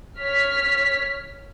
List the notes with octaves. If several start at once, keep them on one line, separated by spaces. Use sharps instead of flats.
C#5 F6 B6